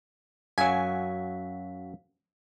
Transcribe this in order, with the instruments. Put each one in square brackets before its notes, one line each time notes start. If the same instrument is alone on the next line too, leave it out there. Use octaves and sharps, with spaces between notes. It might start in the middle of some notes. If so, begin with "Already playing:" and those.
[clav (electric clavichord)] F#2 F#3 [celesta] F5 B6 [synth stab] G#5